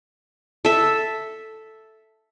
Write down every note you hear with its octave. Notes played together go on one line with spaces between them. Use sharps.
A4 E5